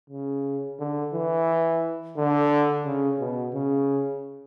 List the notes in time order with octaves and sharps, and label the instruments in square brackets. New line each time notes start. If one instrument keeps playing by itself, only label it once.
[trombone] C#3
D3
E3
D3
C#3
B2
C#3